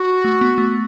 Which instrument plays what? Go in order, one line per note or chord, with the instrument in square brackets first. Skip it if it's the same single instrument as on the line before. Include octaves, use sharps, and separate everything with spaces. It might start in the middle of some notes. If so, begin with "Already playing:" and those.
Already playing: [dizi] F#4
[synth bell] A3
B3
A3